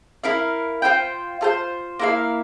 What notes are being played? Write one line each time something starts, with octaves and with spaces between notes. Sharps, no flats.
E4 A#4 F5
F4 C5 G5
F4 A4 C5
A#3 E4 A#4 F5